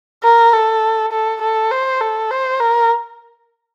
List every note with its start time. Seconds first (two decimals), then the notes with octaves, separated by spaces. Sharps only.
0.23 A#4
0.53 A4
1.12 A4
1.41 A4
1.71 C5
2.01 A4
2.30 C5
2.59 A#4